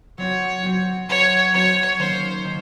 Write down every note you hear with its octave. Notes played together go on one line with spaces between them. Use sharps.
F#3 C4 F#4 C#5
F#3 C4 F#4
F#3 C4 F#4 C#5
F#3 C4 F#4 C#5
D#3 A#3 C#4 C5
D#3 A#3 C#4